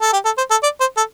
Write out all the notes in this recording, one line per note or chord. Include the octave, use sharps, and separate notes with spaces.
A4
G4
A4
C5
A4
D5
C5
A4